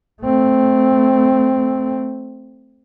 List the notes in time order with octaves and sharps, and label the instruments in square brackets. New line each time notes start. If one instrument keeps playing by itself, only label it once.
[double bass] A3 C4